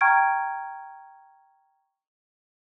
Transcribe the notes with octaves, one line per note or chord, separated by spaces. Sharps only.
G5 A#5 C#6 F6 G#6 D7